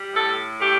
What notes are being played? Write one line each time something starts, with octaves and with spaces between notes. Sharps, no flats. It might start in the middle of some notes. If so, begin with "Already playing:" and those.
Already playing: G3
A2 A4
A3 G4